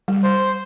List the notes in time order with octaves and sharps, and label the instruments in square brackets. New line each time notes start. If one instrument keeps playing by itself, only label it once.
[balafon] G3
[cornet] C5